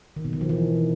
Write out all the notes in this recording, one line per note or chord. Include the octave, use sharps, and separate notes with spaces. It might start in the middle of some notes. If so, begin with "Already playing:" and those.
D#3
B2
D#3
F3
E3